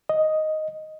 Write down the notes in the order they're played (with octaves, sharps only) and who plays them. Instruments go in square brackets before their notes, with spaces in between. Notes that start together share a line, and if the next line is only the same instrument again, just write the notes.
[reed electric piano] D#5